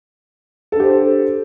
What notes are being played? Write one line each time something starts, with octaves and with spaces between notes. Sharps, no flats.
D4 G4 A4 C5